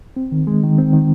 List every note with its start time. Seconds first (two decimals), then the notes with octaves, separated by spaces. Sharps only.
0.16 C4
0.32 D#3
0.47 G#3
0.63 D#3
0.78 C4
0.93 D#3